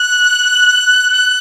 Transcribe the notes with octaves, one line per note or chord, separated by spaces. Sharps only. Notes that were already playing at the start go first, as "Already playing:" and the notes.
Already playing: F#6
F#6